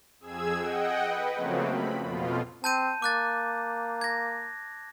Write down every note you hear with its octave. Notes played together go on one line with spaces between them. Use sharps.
F2 G#4 E6 G#6
D#5 F#5 G5
B4
C#3 F3 F#3 A3 A#3 C4
B5
F2 B2 F4
C4 A5 G6 D#7
A#3 D6 F#6 A6
G#6 A#6